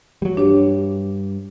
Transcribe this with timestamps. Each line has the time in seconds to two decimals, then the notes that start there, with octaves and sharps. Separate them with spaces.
0.22 F#3 G3
0.37 G2 D4 G4 C#5